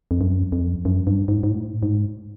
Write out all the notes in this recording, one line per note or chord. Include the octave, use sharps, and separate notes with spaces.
F2
F#2
F2
F#2
G2
G#2
G#2
A2
G#2